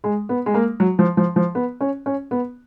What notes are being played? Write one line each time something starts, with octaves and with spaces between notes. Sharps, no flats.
G#3
B3
G#3
A#3
F#3
F3
F3
F3
B3
C#4
C#4
B3